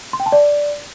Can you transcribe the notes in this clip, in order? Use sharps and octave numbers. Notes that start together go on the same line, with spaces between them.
C6
G5
A5
D5